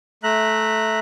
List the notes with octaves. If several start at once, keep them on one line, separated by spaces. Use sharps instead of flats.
A3 E5 A#5 F#6